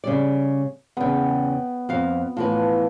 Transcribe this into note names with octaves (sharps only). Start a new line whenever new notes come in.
C#3 G3 D5
E2 C#3 B3 G5
F2 F5
A2 E3 F3 B4